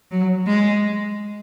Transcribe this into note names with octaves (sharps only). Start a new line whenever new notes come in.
F#3
G#3